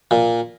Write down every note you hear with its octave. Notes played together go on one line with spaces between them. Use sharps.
A#2